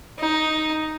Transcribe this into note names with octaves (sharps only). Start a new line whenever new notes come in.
D#4